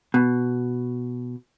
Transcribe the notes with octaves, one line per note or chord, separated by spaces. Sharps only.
B2